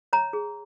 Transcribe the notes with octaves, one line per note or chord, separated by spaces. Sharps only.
C#5 A#5
G#4